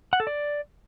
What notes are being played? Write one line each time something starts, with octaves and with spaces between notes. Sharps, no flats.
F#5
A4
D5